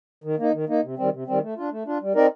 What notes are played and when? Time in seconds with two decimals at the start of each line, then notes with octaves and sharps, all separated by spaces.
0.24 D#3
0.39 A#3 D#4
0.53 D#3
0.69 A#3 D#4
0.83 C3
0.97 D#3 G3 C4
1.12 C3
1.27 D#3 G3 C4
1.42 A3
1.57 D4 F4
1.72 A3
1.86 D4 F4
2.01 G3
2.15 C4 D#4 A#4 D5